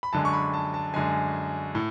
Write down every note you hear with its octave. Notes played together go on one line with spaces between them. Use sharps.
B5
F#2 D3 G#3 A5
C#6
B5
A5
A5
F#2 D3 G#3 G#5
A2